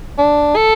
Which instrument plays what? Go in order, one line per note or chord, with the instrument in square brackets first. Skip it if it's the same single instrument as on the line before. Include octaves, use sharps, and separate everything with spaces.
[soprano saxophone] D4
A4